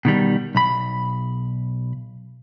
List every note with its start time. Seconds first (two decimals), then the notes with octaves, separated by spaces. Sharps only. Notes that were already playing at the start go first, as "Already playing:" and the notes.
0.05 B2 D#3 G3
0.55 B1 B5